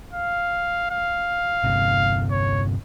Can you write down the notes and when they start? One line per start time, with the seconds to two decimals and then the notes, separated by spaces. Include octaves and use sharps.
0.13 F5
0.91 F5
1.64 G1 C3
2.31 C#5